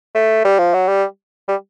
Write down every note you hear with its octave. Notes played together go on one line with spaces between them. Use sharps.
A3
G3
F3
F#3
G3
G3